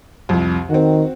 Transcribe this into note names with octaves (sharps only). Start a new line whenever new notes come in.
C2 F2
D#3 C4 F#4